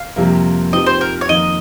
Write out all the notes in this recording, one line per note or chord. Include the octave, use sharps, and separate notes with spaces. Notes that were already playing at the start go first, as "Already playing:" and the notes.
Already playing: F5
F2 C3 G3 A#3
F3 C4 D#4 G4 D#5
C5
A#4
C#5
F2 D#3 A#3 D#5